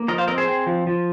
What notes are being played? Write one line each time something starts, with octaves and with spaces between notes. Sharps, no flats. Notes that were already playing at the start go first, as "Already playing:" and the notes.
Already playing: A#3
F3 A#4 D#5
C5 F5
C4 A#4 D#5
G#4 C5
C4
F3
F3